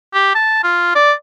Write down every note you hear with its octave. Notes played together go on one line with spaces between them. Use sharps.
G4
A5
F4
D5